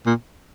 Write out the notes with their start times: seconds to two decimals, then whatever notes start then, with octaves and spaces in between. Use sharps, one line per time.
0.06 A#2